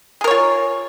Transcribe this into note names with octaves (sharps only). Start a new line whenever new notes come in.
F4 G#4 A#4 C#5